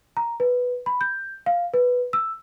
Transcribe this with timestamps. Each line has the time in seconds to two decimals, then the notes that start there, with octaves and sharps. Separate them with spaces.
0.17 A#5
0.40 B4
0.86 B5
1.01 G6
1.46 F5
1.74 B4
2.13 E6